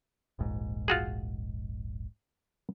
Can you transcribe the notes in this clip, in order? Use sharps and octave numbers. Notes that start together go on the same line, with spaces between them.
D#1 A#1 G#2
F4 F#4 G#4